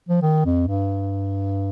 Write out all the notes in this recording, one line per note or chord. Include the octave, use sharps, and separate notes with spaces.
F3
D#3
F2
G2